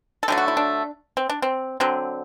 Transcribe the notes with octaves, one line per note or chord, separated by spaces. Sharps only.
A4
D3 F#3 A3 G4
F#4
E4
D4
C4
D4
C4
D3 F#3 C4